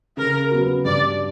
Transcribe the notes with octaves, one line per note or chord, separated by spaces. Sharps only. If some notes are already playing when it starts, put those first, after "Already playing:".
C#3 A#4
F#3 B3 F#4
G2 D5